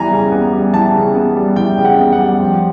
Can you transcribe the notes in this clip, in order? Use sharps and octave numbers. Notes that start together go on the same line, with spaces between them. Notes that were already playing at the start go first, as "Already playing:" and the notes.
Already playing: E3 G3 B3 G#5 A#5
C#3
B3
G3
E3 A5
C#3
B3
G3
E3 G5
C#3
F#5
B3
F#5
G3
F3